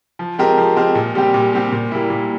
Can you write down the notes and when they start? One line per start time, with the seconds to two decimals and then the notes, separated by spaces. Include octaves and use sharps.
0.19 F3
0.38 G#3 C4 G4 A#4
0.58 F3
0.76 G#3 C4 G4 A#4
0.95 A#2
1.15 G3 C4 G4
1.34 A#2
1.53 G3 C4 G4
1.72 A#2
1.91 G3 A#3 E4
2.10 A#2